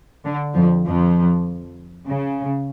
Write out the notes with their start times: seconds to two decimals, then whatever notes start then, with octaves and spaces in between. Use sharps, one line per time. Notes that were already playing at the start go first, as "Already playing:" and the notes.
0.25 D3
0.55 F2 F3
0.86 F2 F3
2.08 C#3